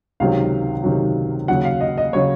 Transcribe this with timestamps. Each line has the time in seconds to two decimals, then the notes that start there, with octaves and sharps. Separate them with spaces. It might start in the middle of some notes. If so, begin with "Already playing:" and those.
0.20 C#2 C3 D#3 F#3 F5
0.84 C#2 C3 D#3 F#3
1.48 D#2 C#3 F#3 F#5
1.65 F5
1.81 D#5
1.98 D#5
2.13 C#3 F#3 C#5